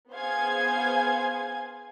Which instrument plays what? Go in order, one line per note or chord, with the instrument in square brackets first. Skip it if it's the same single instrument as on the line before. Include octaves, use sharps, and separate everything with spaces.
[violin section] B3 G#4 C5 F5 G#5 G#6